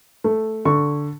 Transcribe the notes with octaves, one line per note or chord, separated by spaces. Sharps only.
A3
D3 C#6